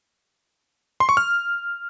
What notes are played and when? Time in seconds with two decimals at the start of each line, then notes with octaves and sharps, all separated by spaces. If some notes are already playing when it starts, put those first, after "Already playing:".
1.00 C6
1.09 C#6
1.17 F6